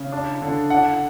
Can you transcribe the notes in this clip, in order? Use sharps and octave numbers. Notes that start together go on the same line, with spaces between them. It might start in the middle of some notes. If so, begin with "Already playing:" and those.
Already playing: C#3
D4
D3
D4 F#5